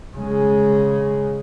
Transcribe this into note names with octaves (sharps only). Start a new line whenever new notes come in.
C#3 G#3